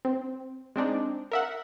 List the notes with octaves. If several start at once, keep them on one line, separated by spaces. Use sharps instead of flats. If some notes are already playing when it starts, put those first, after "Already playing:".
C4
G#3 C4 D4 D#4
A#4 E5 F#5